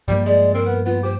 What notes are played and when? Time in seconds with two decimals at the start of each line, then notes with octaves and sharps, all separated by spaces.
0.08 G2 F3 G3 A#3
0.26 G#3 D5
0.54 C4 A#4
0.66 B3
0.86 B3 F4
1.03 G4 C5